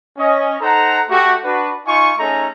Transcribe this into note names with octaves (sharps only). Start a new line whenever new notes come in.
C#4 D#5
D#4 A4 C5 F#5 A#5
A3 F#4 G4
D4 F#4 B4
D#4 F4 G#5 C#6
A3 C#4 D#4 G#4 A4 A#5